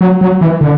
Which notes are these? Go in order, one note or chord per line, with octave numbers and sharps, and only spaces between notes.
F#3
F#3
E3
D3